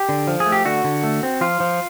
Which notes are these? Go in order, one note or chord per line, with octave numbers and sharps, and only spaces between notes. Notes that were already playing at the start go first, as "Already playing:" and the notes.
Already playing: G4
D3
F3
G#4
A3
G4
D3 F#4
D3
A3
C4
F3 F4
F3